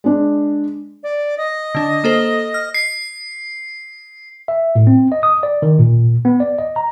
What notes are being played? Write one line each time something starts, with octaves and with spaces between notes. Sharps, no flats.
G#3 D4
D5
D#5
D3 D4
A#3 A4 C5
F6
C7
E5
A2
C4
D#5
D#6
D5
D#3
A#2
B3
D5
D#5
A#5